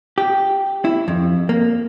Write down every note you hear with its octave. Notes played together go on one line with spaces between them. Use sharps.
G4
E4
F2
A#3